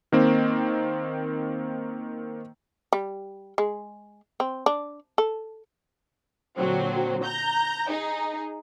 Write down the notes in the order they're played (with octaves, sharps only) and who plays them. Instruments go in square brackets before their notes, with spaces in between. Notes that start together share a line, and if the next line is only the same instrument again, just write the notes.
[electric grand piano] D#3 A#3 C4
[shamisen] G3
G#3
C4
D4
A4
[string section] A#2 D3 F#3 C4
A#5 G6
D#4 G#4